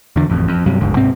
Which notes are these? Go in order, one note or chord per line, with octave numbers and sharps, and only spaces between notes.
E2 D3
A1 F2
F2
G2 C3 F#3
G1 D2 G#2 D3
G#2 C3 C4